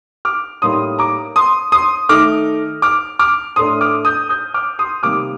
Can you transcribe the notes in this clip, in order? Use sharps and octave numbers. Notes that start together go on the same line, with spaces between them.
D6 F6
A2 G3 A#3 D#4 C6 D#6
A#5 D6
C6 D#6
C6 D#6
D#3 A3 D#4 D6 F6
D6 F6
D6 F6
A2 A3 D4 C6 D#6
D6 F6
D#6 G6
D#6 G6
D6 F6
C6 D#6
C3 D#3 G3 A#3 D6 F6